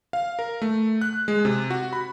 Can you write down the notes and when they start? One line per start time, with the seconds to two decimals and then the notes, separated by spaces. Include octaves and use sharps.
0.13 F5
0.39 A#4
0.62 A3
1.01 F#6
1.28 G#3
1.45 C3
1.70 F#4
1.93 B5